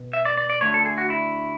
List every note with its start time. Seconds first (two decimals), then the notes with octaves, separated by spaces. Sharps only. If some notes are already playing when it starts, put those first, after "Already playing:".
Already playing: B2
0.13 E5
0.25 D5
0.38 D5
0.50 D5
0.61 D2 D3 A3 C#5
0.74 A4
0.85 G#4
0.98 F#4
1.10 E4